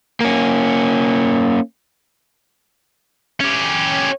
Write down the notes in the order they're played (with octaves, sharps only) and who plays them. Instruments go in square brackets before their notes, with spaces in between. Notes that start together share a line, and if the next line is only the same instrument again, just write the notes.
[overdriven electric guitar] A#3 C#4
[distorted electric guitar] C#4 G4